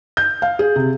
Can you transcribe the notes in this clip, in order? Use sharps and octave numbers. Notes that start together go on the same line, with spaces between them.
G6
F5
G#4
C3